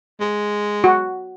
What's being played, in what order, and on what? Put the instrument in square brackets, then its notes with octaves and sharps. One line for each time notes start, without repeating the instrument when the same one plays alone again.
[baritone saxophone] G#3
[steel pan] F#4